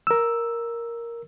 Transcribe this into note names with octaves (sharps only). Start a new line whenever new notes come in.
A#4 E6